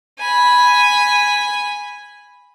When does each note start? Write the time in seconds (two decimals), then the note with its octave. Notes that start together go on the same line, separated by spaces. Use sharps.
0.19 G#5 B5